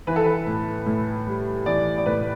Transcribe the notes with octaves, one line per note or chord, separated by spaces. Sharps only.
E3 B4
A4
B4
A2
A2
G3
E3 D5
D5
A2 B4